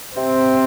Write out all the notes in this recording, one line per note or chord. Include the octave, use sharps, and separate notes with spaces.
C3 C4